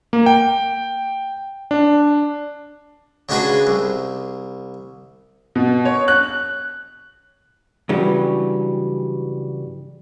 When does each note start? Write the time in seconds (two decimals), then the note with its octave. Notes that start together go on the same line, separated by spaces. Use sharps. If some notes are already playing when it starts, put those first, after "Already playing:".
0.13 A#3
0.26 G5
1.71 D4
3.29 C#3 G#3 D4 F#4 G#4 B4
3.67 C2
5.55 B2
5.85 C#5
6.08 F#6
7.89 G2 C#3 E3 F#3 G3